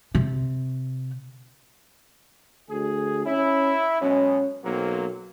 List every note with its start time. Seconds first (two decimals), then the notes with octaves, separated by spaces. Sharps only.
0.15 C3
2.70 D2 G#4
3.26 C#4 E4
4.01 B2 F#3 G#3 C#4
4.64 B1 F#3 A#3 C4